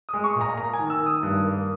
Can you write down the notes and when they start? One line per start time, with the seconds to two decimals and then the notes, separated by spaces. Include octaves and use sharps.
0.09 G#3 D#6
0.24 C#6
0.36 A#2
0.41 A#5
0.57 A#3 A#5
0.73 G#5
0.79 D#3
0.90 E6
1.00 D#3
1.06 D#6
1.23 G2
1.45 A#3